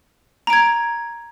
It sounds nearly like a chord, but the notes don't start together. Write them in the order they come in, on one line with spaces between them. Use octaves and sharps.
A#5 D7 G#6